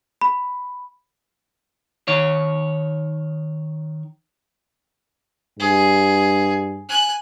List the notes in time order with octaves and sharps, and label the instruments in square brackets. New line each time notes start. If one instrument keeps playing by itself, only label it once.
[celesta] B5
[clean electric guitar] D#3 C#5
[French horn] G2 [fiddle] G#4
[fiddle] G#5 F#6